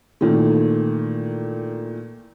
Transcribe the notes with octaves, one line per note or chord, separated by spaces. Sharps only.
A#2 D#3 E3 A3